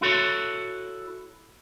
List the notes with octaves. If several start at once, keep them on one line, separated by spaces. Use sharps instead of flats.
E4 F#4 A4 C#5